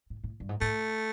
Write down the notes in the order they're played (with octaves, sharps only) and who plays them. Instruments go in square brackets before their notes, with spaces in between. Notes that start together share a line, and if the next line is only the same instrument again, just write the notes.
[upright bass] A2
A2
G2
G#2
[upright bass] A2 [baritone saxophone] A3